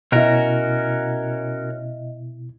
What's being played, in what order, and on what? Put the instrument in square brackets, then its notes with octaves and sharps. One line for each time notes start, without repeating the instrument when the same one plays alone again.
[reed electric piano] B2 E4 [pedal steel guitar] C#4 F#4 A#4 [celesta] D#5 E5